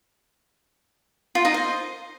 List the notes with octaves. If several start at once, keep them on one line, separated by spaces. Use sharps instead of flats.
F4
D#4
C5